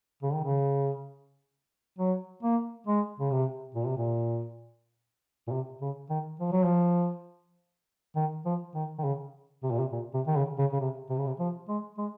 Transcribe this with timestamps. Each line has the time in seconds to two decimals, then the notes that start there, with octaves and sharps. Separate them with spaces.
0.23 C#3
0.33 D#3
0.44 C#3
1.99 F#3
2.43 A#3
2.87 G#3
3.20 C#3
3.31 C3
3.75 A#2
3.86 C3
3.97 A#2
5.47 A#2
5.51 C3
5.81 C#3
6.10 D#3
6.40 F3
6.52 F#3
6.64 F3
8.16 D#3
8.45 F3
8.75 D#3
8.98 D#3
9.04 C#3
9.63 C3
9.71 A#2
9.79 C3
9.92 A#2
10.14 C3
10.27 D#3
10.36 C#3
10.58 C#3
10.73 C#3
10.80 C3
11.10 C3
11.18 C#3
11.27 C3
11.39 F3
11.68 G#3
11.98 G#3